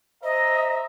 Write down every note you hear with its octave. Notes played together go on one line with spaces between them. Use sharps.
C5 D#5 E5 A#5